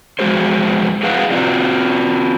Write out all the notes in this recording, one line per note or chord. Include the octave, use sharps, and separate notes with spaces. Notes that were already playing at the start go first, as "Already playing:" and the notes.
F2 G#3 F#4 G#4 C5
F#3 E4 G#4 B4 F5 F#5
C4 F4 F#4 D5